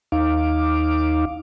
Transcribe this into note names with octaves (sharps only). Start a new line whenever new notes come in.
D#2 D#4 F5 D6